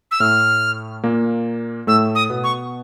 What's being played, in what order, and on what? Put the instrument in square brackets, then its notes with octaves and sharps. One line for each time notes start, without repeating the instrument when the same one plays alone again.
[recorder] E6
[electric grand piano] A2 A3 [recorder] F6
[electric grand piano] A#2 A#3
[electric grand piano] A2 A3 [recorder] E6
[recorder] D#6
[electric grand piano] B2 B3
[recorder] C#6